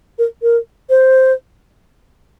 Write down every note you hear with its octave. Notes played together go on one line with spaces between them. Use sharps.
A#4
A#4
C5